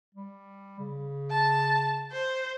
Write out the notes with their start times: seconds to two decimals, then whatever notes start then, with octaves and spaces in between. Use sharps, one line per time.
0.14 G3
0.79 C#3
1.31 A5
2.12 C5